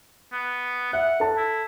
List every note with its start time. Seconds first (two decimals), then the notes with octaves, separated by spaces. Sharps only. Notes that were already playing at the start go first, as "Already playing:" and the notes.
0.33 B3
0.93 E5 F#5
1.20 A4 A5
1.37 E4